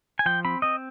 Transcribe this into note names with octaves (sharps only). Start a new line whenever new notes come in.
G#5
F3 G5
C4 B5
C4 D#5